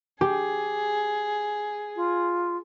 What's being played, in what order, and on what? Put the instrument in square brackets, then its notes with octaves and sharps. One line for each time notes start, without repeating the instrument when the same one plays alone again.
[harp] G4 [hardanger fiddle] G#4
[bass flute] F4